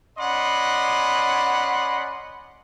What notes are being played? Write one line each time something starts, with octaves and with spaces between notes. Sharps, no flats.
C#4 D5 D#5 F#5 B5 C6